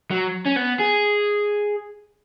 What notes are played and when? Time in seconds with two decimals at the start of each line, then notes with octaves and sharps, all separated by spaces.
0.11 F#3
0.46 C#4
0.56 B3
0.79 G#4